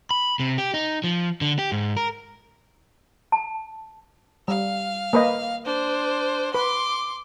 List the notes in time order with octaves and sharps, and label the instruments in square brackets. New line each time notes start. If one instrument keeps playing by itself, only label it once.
[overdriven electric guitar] B5
C3
G4
D#4
F3
D3
G4
G#2
A#4
[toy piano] A5
[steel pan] G3 [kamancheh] F5
[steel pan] A#3 B4 D#5
[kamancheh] D4 C5
[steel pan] B4 [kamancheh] C6 D6